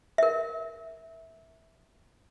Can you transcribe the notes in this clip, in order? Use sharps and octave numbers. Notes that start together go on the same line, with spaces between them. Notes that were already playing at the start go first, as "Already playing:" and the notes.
A#4 E5